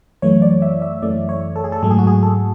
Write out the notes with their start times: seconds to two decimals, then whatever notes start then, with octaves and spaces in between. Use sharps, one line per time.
0.22 F#2 E3 A3 C#5
0.42 D5
0.62 E5
0.82 E5
1.02 F#2 E3 A3 D5
1.29 C#5
1.56 A4
1.64 G#4
1.72 A4
1.83 G#2 F#3 A3 A4
1.91 G#4
1.99 F#4
2.07 G#4
2.23 A4